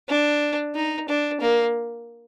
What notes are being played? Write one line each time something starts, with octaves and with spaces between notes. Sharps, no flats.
D4
D#4
D4
A#3